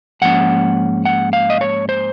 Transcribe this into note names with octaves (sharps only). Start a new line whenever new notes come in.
G#2 F3 A#3 C#4 F#5
F#5
F5
D#5
C#5
C5